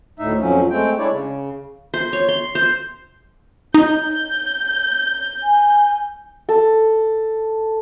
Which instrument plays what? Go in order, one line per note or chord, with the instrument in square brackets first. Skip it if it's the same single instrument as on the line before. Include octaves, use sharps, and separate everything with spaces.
[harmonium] D2 A2 D#4 E5
F2 F3 F#3 C#4
G#3 A3 C4 G5
G#3 D4 E4 C#5 D5
C#3
[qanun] C5
C#5
C6
C5
[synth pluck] D#4 [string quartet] G6
[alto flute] G#5
[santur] A4